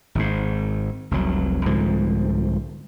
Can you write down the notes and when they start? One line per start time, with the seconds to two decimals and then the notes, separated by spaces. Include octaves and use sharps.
0.15 G#1 G#2
1.11 F1 C2 F#3
1.66 C2 G#2 D3 F3